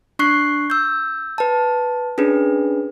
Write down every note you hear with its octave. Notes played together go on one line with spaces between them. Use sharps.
D4 C#6 F#6 C7
E6 G6
B4 A5
C#4 D4 G#4 B4